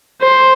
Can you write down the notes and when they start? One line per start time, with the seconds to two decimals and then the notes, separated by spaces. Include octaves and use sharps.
0.21 C5